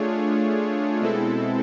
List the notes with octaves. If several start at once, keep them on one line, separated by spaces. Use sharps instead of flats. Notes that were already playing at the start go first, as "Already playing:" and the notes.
Already playing: A3 D4 F4 G#4 C#5
B2 G#3 C4 E4 A4